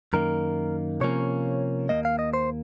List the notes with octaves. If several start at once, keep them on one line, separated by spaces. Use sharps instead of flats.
F#2 D#3 A#3 A#4
C3 F3 A#3 C#4 C#5
D#2 D#3 A#3 D#5
F5
D#5
C5